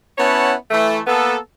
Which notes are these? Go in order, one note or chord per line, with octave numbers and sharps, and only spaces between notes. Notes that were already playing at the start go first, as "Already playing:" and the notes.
B3 C#4 E4 C#5 F#5 A5
E3 A3
A#3 B3 A4